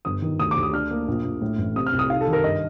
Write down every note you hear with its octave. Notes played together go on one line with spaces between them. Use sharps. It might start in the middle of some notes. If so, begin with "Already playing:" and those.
G1 D#6
D#3
D2 D#6
D6
D2
D#6
D4 F6
A#3
A#1
A#1
A2
A1
C3 D#6
F6
C2
D#6
D#4 F5
A4
D#3
A#4
G2 D#5